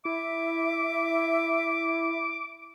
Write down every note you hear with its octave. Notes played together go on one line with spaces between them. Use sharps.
E4 E5 D6